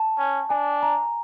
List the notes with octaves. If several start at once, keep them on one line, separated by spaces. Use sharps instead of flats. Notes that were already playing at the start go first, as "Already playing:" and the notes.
Already playing: A5
C#4
D4 G#5
A#5